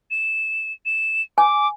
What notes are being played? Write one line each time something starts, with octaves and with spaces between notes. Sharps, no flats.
E7
E7
G#5 D6